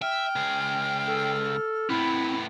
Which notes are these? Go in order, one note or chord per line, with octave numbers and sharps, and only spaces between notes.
E5 G5 F6
C#2 G#4
A4
A2 B3 C4 E4